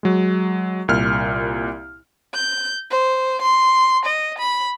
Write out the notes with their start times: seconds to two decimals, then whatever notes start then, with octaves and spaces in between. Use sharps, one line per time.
0.03 F#3 G#3
0.88 C2 A#2 F6
2.34 G6
2.91 C5
3.42 C6
4.05 D#5
4.39 B5